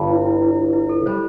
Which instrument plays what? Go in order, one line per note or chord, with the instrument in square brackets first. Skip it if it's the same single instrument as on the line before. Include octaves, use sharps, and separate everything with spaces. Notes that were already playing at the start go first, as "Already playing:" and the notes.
Already playing: [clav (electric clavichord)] G1 G2 G3
[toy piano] E4
E4
E4
E4
A4
[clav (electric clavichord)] G3 [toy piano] C5